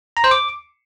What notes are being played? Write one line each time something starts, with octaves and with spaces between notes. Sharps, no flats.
A#5
C5
D6